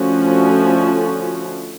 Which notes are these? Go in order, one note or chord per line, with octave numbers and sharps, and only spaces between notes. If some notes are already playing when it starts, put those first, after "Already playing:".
Already playing: D3 F3 A3 C#4 F#4